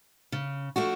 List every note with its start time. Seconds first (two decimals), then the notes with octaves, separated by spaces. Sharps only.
0.32 C#3
0.76 F3 A3 D4 F#4